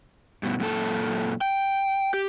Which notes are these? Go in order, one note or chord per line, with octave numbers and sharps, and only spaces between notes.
G2 B2
F#2 A#2 A4
G5
G4